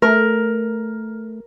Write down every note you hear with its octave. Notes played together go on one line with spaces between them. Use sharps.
A3 A#4